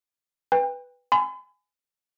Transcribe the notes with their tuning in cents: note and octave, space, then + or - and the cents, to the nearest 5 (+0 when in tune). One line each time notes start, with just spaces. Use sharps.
B4 +0 G5 +35
G#5 +0 B5 +45